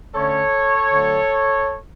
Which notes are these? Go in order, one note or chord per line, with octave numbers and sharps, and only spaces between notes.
D3 A3 C#4 A4 C#5
D3 F#3 A3